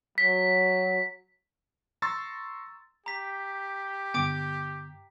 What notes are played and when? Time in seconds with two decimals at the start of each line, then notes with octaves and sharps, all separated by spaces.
0.18 F#3 B6
2.02 A#5 C6 C#6 E6 A6
3.06 G4 A#5 B6
4.14 G2 D3 B3 G5 D6